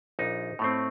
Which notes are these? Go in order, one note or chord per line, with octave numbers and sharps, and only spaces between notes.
A#1 D#4
A2 A3 C4